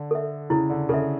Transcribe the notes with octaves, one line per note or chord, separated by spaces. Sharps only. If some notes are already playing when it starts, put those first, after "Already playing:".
Already playing: D3
A4 E5
C#3 E4
D3
C#3 A4 E5